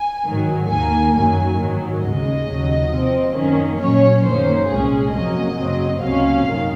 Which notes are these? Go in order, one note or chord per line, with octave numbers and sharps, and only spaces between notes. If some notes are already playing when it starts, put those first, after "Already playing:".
Already playing: G#5
G#2 D#3 F#3
D#2 D#3 A#3 G#5
F#2 D#3 F#3 A#3 G#5
G#2 D#3 F#3
D#2 C#3 G#3 D#5
D#2 C#3 F#3
C3 F3 C4
F#2 D#3 A#3 C#4
A#2 F#3 C#4 C#5
F#2 D#3 A#3 C#4 C5
C2 A#2 G#3 C#4 G#4
F2 C3 F#3 A#3 C#4 D#5
F#2 C#3 F#3 C4
C#2 C3 F#3 A#3 C#4 F5
F#2 D#3